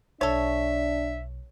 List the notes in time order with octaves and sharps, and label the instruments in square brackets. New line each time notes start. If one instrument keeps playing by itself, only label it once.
[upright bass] B1 [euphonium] D4 [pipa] A4 C#5 [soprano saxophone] E5